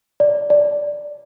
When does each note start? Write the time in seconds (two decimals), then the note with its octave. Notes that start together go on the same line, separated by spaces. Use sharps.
0.20 D5
0.50 D5